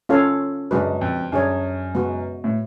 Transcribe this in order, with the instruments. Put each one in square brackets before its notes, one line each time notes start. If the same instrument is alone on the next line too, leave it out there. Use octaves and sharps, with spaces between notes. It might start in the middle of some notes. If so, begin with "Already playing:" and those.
[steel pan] C#4 F4 A4 C#5 F5
[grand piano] F#2 [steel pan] G#3 D4 F#4 B4
[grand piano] F2
[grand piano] F#2 [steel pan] D4 G#4 C#5
[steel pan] G#3 B3 F#4
[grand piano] A2